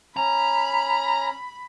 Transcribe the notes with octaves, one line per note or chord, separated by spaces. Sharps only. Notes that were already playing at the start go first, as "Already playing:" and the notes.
C#4 A#5 B5